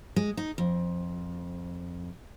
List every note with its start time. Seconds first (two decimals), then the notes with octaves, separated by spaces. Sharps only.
0.16 G#3
0.37 D#4
0.58 F2